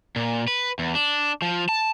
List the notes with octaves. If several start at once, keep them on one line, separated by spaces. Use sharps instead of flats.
A#2
B4
E2
D4
F3
A5